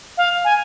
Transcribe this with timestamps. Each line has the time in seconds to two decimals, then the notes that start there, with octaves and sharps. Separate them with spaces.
0.17 F5
0.45 G#5